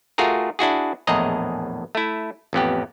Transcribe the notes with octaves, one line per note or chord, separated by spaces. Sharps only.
A3 F4 F#4 G#4 A#4
D4 E4 F#4 G#4
A#1 E2 A2 G#4 D#5 A#5
A3 E4
A1 F2 B3 G4